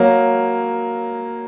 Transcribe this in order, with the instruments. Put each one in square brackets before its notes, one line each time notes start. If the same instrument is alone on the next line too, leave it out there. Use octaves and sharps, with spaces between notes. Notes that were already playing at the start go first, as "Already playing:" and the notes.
Already playing: [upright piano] F#3 A#3